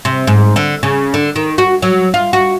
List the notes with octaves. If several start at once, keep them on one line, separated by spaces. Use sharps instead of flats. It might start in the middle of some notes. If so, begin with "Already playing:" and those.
C3
G#2
D3
C#3
D3
D#3
F#4
F#3
F4
F#4